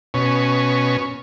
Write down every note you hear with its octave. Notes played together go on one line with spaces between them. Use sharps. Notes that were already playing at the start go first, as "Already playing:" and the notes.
B2 C#4